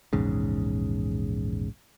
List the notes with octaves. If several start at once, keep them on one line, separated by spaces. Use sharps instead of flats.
A#1 E2 G#2 C#3